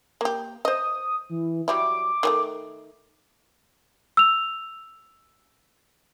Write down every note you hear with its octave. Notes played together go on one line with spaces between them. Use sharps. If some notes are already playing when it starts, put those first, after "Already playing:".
A#3 G4
C5 D#5 D#6
E3
F#3 G3 E4 D6
D#3 G3 A3
E6 F7